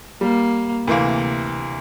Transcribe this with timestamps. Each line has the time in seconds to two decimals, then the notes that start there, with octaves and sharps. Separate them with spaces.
0.21 G3 A#3
0.87 D2 C3 E3 A#3